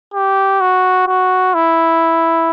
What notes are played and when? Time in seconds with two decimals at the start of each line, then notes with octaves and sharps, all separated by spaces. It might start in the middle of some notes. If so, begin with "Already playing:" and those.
0.14 G4
0.61 F#4
1.07 F#4
1.54 E4